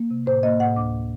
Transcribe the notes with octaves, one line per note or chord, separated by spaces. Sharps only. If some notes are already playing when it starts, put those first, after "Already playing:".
Already playing: A#3
C3
A2 C5
A#3 D#5
A2 F#5
D2 D6